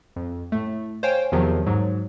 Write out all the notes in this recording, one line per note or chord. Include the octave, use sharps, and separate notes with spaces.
F2
A2 A3
C5 C#5 F5 G5 G#5
E2 C3 D#3 F3 F#3
G#2 F#3